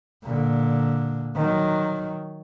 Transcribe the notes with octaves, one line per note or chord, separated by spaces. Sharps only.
A#2 D3
D#3 F#3